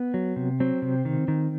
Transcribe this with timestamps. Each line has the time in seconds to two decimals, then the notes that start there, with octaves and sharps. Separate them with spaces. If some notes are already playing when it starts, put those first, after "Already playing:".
Already playing: B3
0.14 F#3
0.36 C3
0.60 F#3 C4
0.82 C3
1.05 D#3
1.28 D#3